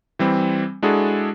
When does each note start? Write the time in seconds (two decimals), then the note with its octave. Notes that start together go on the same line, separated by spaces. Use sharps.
0.19 E3 G3 C4
0.82 G#3 D4 E4 F#4 G#4 A4